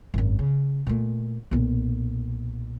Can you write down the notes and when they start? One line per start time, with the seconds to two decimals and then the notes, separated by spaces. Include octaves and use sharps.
0.14 G#1 F#2
0.39 C#3
0.87 A#2 A3
1.51 B1 A#2